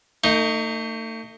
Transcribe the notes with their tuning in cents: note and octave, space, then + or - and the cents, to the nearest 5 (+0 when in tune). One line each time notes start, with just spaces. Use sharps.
A3 +40 D#4 +0